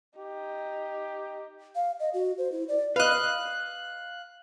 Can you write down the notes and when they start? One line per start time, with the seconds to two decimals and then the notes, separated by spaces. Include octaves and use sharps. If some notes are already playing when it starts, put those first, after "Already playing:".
0.18 D#4 G4
1.75 F5
2.00 D#5
2.14 F#4
2.38 C5
2.52 E4
2.68 D5
2.96 B4 D#5 F5 F#6